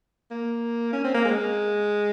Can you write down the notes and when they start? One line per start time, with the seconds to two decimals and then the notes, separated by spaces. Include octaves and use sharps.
0.31 A#3
0.93 C#4
1.04 C4
1.14 A#3
1.25 G#3